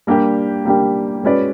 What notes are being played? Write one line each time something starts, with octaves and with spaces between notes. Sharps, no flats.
G3 A#3 D4 G4
G3 A#3 D4 G4
G#3 C#4 F#4 B4 D5